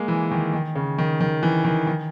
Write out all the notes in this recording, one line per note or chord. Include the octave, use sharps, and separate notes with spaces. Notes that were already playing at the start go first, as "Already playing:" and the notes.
Already playing: G#3 A#3
E3
D#3
D#3
C#3
D#3
D#3
E3
D#3
D#3